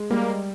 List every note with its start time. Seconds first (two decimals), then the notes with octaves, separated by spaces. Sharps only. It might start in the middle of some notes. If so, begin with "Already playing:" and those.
Already playing: G#3
0.10 G3 A#3